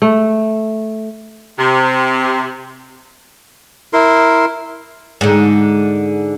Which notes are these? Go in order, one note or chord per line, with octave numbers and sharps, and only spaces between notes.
A3
C3
E4 A#4 C6
G#2 D3